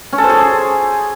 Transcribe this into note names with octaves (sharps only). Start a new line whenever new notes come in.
C#4
A4
C5
G#4